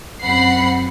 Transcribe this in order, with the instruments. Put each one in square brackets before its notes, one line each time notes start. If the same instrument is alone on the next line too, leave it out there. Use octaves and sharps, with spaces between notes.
[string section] F#2 C4 F#5 B5 C7